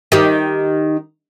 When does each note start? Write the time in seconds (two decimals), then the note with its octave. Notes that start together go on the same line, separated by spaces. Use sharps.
0.12 D#3 G4